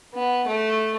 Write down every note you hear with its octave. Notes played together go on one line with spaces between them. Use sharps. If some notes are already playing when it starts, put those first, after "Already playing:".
B3
A3